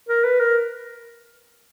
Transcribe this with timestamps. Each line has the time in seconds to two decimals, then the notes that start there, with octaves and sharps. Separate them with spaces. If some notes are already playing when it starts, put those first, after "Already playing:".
0.09 A#4
0.24 B4
0.40 A#4